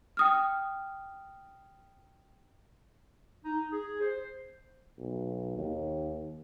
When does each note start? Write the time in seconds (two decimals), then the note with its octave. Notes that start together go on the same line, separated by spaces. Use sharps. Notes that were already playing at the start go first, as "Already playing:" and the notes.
0.17 G5 D#6 F6
3.45 D#4
3.72 G#4
4.02 C5
4.98 B1
5.57 D#2